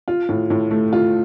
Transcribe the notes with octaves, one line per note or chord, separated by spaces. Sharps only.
F4
A2
A2
A3
F4